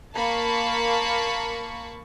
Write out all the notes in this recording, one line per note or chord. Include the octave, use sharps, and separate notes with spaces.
A#3 A5 B5 C#6